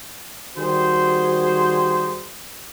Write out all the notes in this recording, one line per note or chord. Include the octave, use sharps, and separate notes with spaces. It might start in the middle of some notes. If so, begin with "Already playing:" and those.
D#3 G3 F#4 G#4 C5